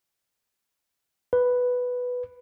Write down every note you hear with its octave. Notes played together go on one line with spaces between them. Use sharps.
B4